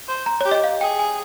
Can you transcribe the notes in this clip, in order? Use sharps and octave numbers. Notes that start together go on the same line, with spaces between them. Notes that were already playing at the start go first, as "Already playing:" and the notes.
C5
A#5
G4 C#5
D#5
F5
G#4 G5
G#5